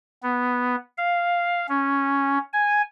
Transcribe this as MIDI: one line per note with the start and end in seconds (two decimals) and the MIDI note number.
0.23 0.76 59
0.98 1.67 77
1.69 2.38 61
2.53 2.82 80